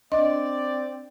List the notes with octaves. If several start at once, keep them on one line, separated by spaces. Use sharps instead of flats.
C4 D4 D5 D#5